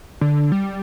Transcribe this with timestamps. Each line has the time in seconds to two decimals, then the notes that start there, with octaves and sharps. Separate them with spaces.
0.21 D3
0.52 G3